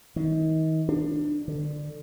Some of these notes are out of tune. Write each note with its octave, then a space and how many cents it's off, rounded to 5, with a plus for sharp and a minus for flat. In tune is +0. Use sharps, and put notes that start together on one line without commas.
D#3 +35
D4 +20
D3 +15